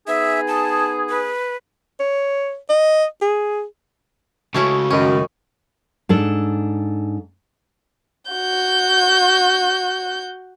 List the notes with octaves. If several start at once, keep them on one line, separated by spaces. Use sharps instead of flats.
B3 D#4 G#4 E5
A5
B4
C#5
D#5
G#4
C#2 C#3 A3 C#4 E4 F#4
F#2 D#3 C#4
G#2 D4 A4
F#4 G6